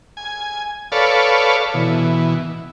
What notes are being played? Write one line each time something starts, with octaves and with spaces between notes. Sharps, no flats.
G#5
A4 B4 C#5 D5 F5
B2 E3